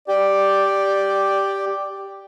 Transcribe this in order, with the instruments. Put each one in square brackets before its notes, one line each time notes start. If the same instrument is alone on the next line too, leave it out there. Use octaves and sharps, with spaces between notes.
[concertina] G4 [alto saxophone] D5